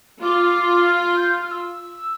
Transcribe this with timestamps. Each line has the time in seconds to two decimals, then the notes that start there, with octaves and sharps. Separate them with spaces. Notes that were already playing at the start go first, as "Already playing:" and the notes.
0.22 F4 D6
0.85 F6
1.01 F6
1.16 G6
1.32 F6
1.47 F6
1.51 E6